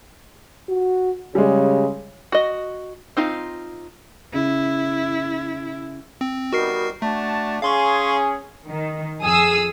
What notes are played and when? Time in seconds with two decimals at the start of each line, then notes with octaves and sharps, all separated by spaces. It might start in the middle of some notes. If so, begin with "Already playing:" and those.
0.69 F#4
1.35 C#3 G3 G#3
2.32 F#4 D#5
3.17 C4 D#4 F4
4.34 C#3 E4
6.21 C4
6.53 G3 B3 D#4 F#4 A#4 C7
7.02 A3 D4 F#4 A5
7.62 C#4 G#4 F5 C6 C#6
8.66 D#3
9.21 F2 G#4 D#6 E6